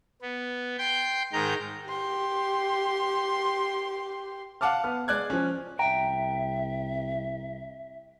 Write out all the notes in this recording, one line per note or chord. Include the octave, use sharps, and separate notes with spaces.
B3
G5 C6 G6
G#2 D#3 A#5 G6
G4 C6
F5 F#5 A5 D6 F6
B3 F6
G#3 D5 F#6 G#6
F3 C#4
C2 E5 G5 A#5